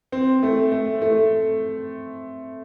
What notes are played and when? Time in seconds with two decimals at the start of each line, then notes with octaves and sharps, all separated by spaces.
0.12 C4
0.43 A3
0.72 A3
1.02 A3